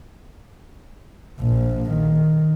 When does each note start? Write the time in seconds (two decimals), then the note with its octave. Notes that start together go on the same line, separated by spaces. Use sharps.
1.40 A#1
1.90 D#3